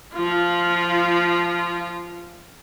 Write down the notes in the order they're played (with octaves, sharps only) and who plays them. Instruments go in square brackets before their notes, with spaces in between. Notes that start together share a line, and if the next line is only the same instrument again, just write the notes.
[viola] F3 F4